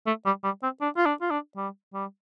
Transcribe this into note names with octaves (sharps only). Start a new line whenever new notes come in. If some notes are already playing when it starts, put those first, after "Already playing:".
A3
G3
G3
C4
D4
F4
D4
F4
D4
G3
G3